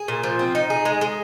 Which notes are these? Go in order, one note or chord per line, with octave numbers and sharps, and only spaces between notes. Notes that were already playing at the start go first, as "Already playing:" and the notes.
Already playing: G#4
A#2
F3
C4
D#4
G#4
G#3
G#3